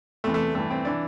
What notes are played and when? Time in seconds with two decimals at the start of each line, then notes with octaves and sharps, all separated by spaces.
0.24 E2 C3 E3 A3
0.34 A3
0.55 G2 E3 A3
0.70 C4
0.85 E3 D4